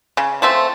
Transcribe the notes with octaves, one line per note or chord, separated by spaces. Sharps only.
C#3
F3 A3 C4